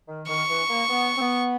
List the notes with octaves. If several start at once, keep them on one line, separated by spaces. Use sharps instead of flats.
D#3
D#3 C#6
E3
A#3
B3
C4
B3